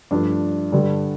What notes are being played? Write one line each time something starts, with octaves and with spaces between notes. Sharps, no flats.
G2 F3 A3 D4
G2 D3 G3